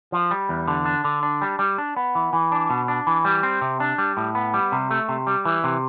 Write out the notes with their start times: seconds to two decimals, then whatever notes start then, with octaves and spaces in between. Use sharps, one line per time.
0.12 F3
0.31 G3
0.49 E2
0.68 D3
0.86 D4
1.04 D3
1.23 D4
1.42 G3
1.59 G3
1.78 D4
1.96 B3
2.15 E3
2.33 E3
2.52 D4
2.70 B2
2.88 D4
3.07 E3
3.25 G3
3.43 C4
3.61 C3
3.80 D4
3.98 G3
4.17 A2
4.35 B3
4.54 G3
4.72 C3
4.91 A3
5.09 C3
5.27 G3
5.45 E3
5.64 C3